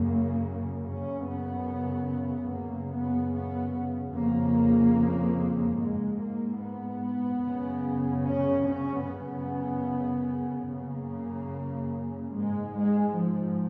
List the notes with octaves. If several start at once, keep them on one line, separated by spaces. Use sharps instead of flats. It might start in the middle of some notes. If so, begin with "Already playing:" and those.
Already playing: F#2 C#3 A#3
F#2 C#3 C#4
B3
F#2 C#3 A#3
B3
B3
F2 C#3 A#3
G#2 G#3
A#3
B3
F#2 C#3
C#4
C#4
F#2 C#3 B3
F#2 C#3 A#3
G#2 G#3
G#3
F3